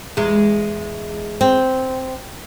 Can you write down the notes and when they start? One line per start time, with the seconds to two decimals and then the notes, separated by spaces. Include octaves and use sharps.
0.17 E2 G#3
1.41 C4